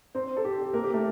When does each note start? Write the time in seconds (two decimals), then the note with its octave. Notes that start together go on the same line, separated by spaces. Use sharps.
0.15 C4 C5
0.37 A4
0.44 G4
0.59 G4
0.74 A#3 A#4
0.84 G4
0.93 A3 A4